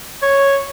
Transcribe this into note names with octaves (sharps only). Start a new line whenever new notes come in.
C#5